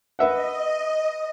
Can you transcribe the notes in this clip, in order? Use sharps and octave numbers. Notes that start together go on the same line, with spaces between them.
B4 D#5 E5 F#5